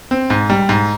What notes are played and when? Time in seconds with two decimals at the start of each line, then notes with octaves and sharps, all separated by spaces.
0.11 C4
0.30 G#2
0.50 G3
0.69 G#2